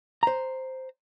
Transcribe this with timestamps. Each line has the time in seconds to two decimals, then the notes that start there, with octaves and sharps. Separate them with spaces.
0.23 C5 A#5